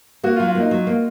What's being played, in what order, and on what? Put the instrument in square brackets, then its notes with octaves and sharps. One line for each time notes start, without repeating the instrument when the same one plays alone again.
[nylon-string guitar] A#3 [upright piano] F#4
[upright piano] F4
[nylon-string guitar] F#3
[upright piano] F4
[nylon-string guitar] A#3 [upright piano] D#4
[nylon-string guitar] F#3
A#3